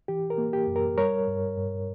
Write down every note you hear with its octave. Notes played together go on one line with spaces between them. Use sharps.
E3 G4
A#4
A#3
G4
F#2
A#4
G3 A#4 C#5
G2
G2